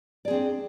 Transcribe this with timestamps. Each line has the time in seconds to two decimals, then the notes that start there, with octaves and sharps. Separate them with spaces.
0.25 D5
0.28 G#4
0.30 C4
0.33 D4